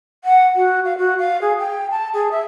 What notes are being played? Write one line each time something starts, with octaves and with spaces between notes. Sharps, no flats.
F#5
F#4
F5
F#4
F5
G#4
G5
A5
G#4
E5